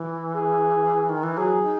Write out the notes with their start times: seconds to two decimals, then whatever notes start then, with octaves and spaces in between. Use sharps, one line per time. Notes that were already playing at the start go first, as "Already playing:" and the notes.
Already playing: E3
0.35 G#4
1.09 D#3
1.23 E3
1.37 F#3 G#4
1.63 D#4